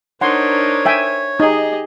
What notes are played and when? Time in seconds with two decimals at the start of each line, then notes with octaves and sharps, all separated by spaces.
0.21 D4 D#4 A#4 C5 C#5 F#5 C6
0.86 E5 G5 G#5
1.40 D#4 G4 G#4 D#5